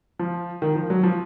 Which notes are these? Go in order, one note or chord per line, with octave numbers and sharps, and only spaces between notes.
F3
D#3
F3
F#3
F3